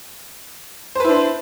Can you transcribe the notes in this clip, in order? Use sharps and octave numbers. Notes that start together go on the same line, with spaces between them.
D4 E4 B4 C5